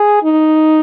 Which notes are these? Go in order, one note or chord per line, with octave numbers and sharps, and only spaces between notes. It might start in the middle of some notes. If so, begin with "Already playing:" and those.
Already playing: G#4
D#4